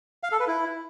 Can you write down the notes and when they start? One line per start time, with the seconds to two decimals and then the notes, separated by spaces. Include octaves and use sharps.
0.23 F5
0.32 A4
0.40 B4
0.48 E4